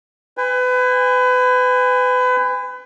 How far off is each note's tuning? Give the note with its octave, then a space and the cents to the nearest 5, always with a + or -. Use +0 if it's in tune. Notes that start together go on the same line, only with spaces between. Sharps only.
B4 +30 G#5 -35